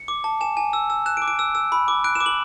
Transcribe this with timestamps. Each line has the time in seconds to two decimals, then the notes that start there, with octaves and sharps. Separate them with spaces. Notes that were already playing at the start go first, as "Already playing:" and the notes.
Already playing: C#7
0.08 D6
0.24 A5
0.41 G#5 E7
0.57 G#5
0.73 E6
0.90 E6
1.06 F#6 E7
1.17 D7
1.22 D6
1.28 D7
1.39 E6
1.55 E6
1.72 B5
1.88 D6
2.04 F#6 D7
2.15 E7
2.20 D6
2.26 F#7